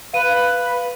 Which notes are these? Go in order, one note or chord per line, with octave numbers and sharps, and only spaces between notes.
B4 F5 D#7